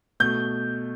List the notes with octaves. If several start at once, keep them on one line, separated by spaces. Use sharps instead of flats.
B2 A3 G6